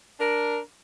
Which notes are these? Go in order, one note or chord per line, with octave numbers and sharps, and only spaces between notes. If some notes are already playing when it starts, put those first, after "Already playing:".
D4 A#4